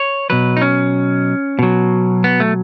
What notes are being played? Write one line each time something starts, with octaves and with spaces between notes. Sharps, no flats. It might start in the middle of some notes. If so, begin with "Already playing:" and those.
Already playing: C#5
B2 F#3 B4
D#4
C#4
B2 F#3
B3
A3